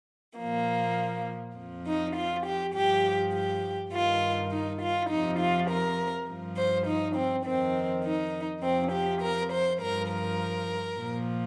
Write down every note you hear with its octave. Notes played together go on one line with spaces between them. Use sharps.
A#2 F3 A#3
F2 F3
D#4
F4
G4
G2 F3 G4
G4
G2 D#3 F4
D#4
F4
F2 C3 F3 D#4
F4
A#4
G2 F3
C5
D#4
C4
F2 D#3 C4
D#4
F2 C3 F3 C4
G4
A#4
C5
G2 F3 A#4
A#4
A#2 F3